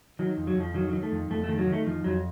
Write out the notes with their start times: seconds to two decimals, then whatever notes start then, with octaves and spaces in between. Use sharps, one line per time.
0.19 D#3 F#3
0.37 F2
0.47 F#3
0.55 F2 F3
0.74 D#3 F#3
0.89 D#3 F#3
1.03 A3
1.12 F2
1.30 F2 A3
1.44 A3
1.49 D#3
1.59 F#3
1.67 D#3
1.72 A3
1.86 F2 F3
2.04 F2 F#3